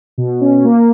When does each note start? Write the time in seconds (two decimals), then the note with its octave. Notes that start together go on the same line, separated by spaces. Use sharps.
0.18 B2
0.41 C#4
0.65 A#3